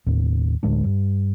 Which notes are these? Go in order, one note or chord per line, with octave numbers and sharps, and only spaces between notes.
D#2 A2
D2 A2 G#3 D4
G2